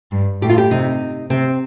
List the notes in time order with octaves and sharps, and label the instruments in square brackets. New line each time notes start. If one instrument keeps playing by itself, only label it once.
[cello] G2
[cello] A2 [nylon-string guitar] G4
[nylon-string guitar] F4
G4
[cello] C3 [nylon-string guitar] D#4
[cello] C3 [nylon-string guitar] C4